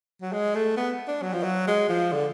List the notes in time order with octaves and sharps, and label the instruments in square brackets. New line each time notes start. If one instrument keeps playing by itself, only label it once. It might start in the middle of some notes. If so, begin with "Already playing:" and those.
[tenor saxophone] F#3
G#3
A3
B3
D4
F#3
F3
F#3
G#3
F3
D3